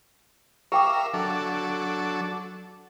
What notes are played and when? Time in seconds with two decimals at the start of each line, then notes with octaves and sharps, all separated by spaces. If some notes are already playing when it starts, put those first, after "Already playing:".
0.72 G4 A#4 E5 F5 G5 D6
1.14 F#3 D4 A4